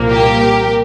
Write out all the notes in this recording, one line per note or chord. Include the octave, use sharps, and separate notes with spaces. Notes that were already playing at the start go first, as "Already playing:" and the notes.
Already playing: C2 A#2 F3 A#3
G4 A#4